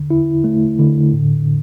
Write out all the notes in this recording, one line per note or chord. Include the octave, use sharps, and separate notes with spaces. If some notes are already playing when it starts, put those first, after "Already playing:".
Already playing: D3
E4
A3
D3
A2